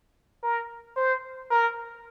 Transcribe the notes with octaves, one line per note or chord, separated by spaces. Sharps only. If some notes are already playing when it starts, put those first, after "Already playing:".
A#4
C5
A#4